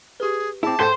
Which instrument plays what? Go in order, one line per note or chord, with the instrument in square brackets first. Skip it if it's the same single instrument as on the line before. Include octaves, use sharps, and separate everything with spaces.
[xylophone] G4 B4 [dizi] G#4
[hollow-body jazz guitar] C4 E4 [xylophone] G#4 E5 D6 [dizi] A5
[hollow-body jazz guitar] G#2 A4 G5 [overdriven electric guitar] C5